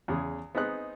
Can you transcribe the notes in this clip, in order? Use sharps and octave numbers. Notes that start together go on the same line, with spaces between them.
E2 C#3 G#4
B3 C4 D#4 G#4 F#6